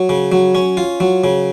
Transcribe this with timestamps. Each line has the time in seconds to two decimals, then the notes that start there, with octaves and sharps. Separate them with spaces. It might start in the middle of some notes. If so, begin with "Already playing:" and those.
Already playing: F#3
0.09 C#3
0.32 F#3
0.55 C#4
0.77 F4
1.00 F#3
1.24 C#3